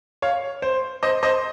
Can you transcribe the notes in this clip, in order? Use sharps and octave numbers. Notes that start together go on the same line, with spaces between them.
C#5 F5
C5
C5 D#5
C5 D#5